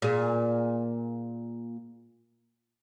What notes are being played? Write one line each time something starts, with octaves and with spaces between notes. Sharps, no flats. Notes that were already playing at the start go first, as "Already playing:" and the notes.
A#2 G#4